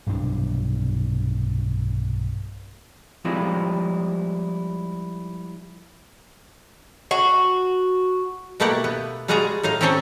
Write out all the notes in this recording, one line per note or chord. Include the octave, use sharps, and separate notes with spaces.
B1 G2 C3 D4
F3 G3 G#3 C4 E4 F4
F#4
B2 A3 A#3 E4 G4 F#5
B3
G3 G#3 F4 F#4 G#4 A#5
A2 D#4 F5 A#5
C4 C#4 G4 A4 C5 C#5